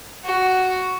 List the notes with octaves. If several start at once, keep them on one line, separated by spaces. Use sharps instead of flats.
F#4